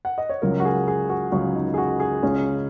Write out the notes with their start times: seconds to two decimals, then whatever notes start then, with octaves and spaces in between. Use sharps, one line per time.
0.05 F#5
0.18 D#5
0.29 C#5
0.42 C#2 C#3 F#3 A#4
0.60 F#4
0.65 G#4
0.88 G#4
1.09 F#4
1.32 C#2 C#3 F#3 F#4
1.55 D#4
1.74 G#4
1.78 F#4
2.00 G#4
2.23 C#2 C#3 G#3 C#4